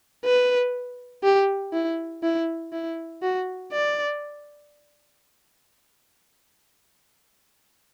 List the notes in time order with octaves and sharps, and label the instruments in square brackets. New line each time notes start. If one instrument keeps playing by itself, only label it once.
[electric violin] B4
G4
E4
E4
E4
F#4
D5